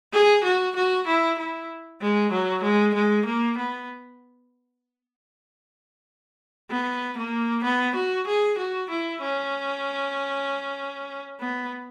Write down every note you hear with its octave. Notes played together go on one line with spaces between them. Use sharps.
G#4
F#4
F#4
E4
E4
G#3
F#3
G#3
G#3
A#3
B3
B3
A#3
B3
F#4
G#4
F#4
E4
C#4
B3